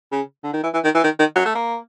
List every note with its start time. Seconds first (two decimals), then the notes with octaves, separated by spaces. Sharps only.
0.12 C#3
0.44 D3
0.53 D#3
0.63 E3
0.74 E3
0.84 D#3
0.94 E3
1.04 D#3
1.19 D#3
1.35 F#3
1.46 A3
1.55 A#3